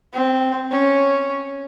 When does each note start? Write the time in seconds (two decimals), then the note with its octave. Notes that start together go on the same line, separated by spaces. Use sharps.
0.13 C4
0.71 C#4